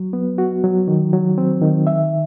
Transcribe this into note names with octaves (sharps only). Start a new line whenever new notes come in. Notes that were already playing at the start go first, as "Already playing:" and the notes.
Already playing: F#3
B3
F#4
F#3
D#3
F#3
C4
D#3
E5